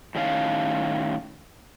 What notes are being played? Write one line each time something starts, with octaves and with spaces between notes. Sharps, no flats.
A2 D#3 C#4 F5